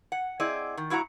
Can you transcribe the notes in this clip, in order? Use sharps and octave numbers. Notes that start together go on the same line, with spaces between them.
F#5
C4 E4 G#4 D5 D#5
D#3
G2 E4 F#4 F#5 A#5